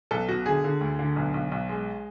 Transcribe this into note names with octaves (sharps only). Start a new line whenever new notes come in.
B1 A4
B2 F#4
D3 G#4
D3
D2
D3
B1
B1
B1
G#3